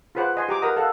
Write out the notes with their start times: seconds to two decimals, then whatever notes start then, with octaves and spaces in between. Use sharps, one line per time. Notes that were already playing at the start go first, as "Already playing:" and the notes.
0.15 F4 G#4 B4 C5 F#5 D6
0.37 D#5 G#5 C6
0.49 G4 A#5 D6
0.62 A#4 B4 D#5 F#5 A#5 D#6
0.77 A4 F5 F#5